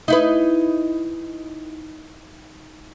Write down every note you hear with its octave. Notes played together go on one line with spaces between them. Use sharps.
D#4 E4 B4